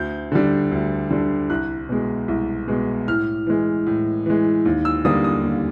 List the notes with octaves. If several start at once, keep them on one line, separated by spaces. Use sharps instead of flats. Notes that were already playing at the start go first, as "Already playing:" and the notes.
Already playing: D2 G6
D3 G3
D2
D3 G3
C2 F#6
B2 G#3
C2
B2 G#3
A2 F6
E3 G#3
A2
E3 G#3
D#2
E6
D3 G3 A#3 D#6
D#6
D#2